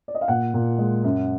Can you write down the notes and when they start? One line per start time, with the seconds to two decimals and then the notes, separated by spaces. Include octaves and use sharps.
0.08 D5
0.15 D#5
0.21 F5
0.28 A#2 F#5
0.54 A#2
0.78 G#3
1.04 F#2